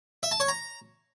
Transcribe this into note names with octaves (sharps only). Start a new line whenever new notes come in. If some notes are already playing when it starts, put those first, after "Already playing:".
E5
A5
C#5
A#5